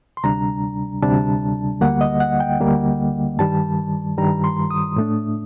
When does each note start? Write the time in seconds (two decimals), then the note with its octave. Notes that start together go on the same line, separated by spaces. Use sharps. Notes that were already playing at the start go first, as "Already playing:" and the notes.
0.17 C6
0.24 D2 C3 G3 D4 A#5
1.02 D2 C3 G3 D4 A5
1.81 D2 D3 G3 A#3 F#5
2.01 D#5
2.20 F#5
2.40 G5
2.60 D2 D3 G3 A#3
3.39 G2 D#3 G3 A5
4.18 G2 D#3 G3 A#5
4.44 C6
4.71 D#6
4.96 A2 A3 D4